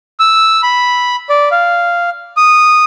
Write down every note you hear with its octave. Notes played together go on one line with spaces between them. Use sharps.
E6
B5
D5
F5
D#6